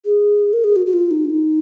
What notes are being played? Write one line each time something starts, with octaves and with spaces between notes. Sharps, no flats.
G#4
A#4
G#4
F#4
F#4
F4
D#4
D4
D#4